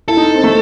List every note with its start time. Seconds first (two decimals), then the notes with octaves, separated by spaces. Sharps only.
0.08 E4 A4
0.17 D#4
0.35 C4
0.44 A3